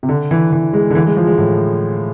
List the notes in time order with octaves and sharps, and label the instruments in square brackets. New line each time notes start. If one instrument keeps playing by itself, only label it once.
[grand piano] C3
D3
E3
E3
G#3
D3
E3
G#3
F3
G#3
A2